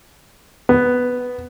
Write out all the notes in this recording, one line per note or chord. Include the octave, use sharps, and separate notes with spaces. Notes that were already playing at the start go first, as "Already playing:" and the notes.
B3